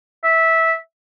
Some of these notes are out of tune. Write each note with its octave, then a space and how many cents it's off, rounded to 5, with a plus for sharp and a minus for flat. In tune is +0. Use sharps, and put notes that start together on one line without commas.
E5 -15